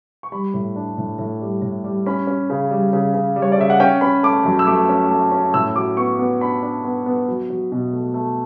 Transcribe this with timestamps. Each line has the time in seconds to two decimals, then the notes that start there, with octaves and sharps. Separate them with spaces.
0.23 C#6
0.32 G3 B5
0.54 A2
0.76 D4
0.98 A2
1.19 A2
1.41 G3
1.62 A2
1.84 G3
2.06 C#4 B5
2.27 C#4
2.50 C#3
2.71 G3
2.93 C#3
3.14 C#3
3.36 G3
3.42 C#5
3.52 D5
3.58 C#3 E5
3.70 F#5
3.80 C#4 G5
4.01 C#4 B5
4.23 A3 D6
4.45 F#2
4.59 E6
4.67 A3 D6
4.89 C#4
5.10 A3
5.32 C#4
5.54 A2 E6
5.75 F#3 D6
5.97 B3 C#6
6.19 B3
6.41 D4 B5
6.63 D4
6.84 B3
7.06 B3
7.28 F#3
7.50 F#3
7.72 B2
7.93 A3
8.14 A3